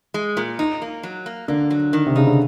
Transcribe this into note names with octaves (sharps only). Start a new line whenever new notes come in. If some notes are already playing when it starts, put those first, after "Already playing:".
G#3
A#2
D#4
A#3
F#3
A#3
D3 A#3
F#3
D#3
C3
C#3 D#4
D3